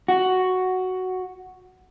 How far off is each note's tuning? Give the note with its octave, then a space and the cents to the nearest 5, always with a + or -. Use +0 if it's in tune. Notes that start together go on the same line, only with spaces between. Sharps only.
F#4 +5